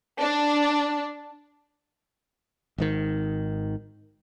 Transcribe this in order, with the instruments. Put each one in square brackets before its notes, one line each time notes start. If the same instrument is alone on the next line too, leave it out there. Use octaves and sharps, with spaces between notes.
[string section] D4
[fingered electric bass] G#1 G#2 D#3